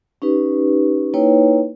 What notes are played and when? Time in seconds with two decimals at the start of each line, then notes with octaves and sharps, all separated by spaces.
0.22 C#4 D#4 G4 B4
1.14 A#3 D#4 E4 B4 C#5 G5